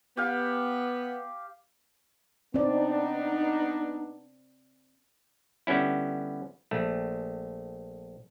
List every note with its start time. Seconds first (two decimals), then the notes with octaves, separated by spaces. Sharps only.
0.17 B3 G4 F5
2.54 B3 C4 D4 D#4 D5
5.67 D3 G3 B3 C#4 E4
6.71 A#1 A3